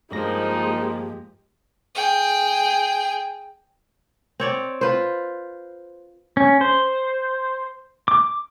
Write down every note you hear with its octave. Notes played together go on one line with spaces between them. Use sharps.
G2 F3 G#3 A#3 D#4 G4 A#6
G#4 G5
C4 C#5 D5
F4 B4 C5
C#4
C5
D6